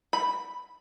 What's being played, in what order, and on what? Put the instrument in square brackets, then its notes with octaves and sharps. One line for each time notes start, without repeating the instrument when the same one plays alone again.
[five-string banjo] B5